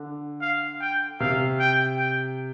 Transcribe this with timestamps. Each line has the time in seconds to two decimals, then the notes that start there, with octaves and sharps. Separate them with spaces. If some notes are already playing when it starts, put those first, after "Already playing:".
Already playing: D3
0.41 F5
0.81 G5
1.20 C3 F5
1.60 G5
1.99 G5